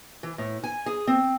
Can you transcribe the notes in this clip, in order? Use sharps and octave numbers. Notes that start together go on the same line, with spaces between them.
E3
A2
G#5
G#4
C4